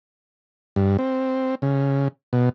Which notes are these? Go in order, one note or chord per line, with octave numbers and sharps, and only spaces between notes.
G2
C4
C#3
B2